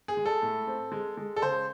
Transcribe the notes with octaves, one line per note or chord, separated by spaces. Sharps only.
G#4
G#3
A4
A2
C4
G#3
G#3
A4
C#3 C5